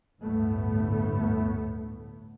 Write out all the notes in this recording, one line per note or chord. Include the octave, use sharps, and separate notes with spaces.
G1 D2 A2 A3 B3